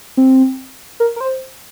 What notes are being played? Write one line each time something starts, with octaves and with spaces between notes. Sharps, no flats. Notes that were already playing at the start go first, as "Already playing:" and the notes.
C4
A#4
A#4
C5